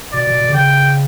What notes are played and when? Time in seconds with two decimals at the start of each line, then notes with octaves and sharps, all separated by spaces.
0.13 B2 D5
0.27 B2
0.41 B2
0.49 D3
0.54 C#3 G5